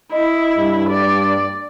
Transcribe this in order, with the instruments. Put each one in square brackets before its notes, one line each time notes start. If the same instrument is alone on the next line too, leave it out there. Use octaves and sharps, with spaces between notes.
[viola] E4 [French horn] D#5
[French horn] G2
[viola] D5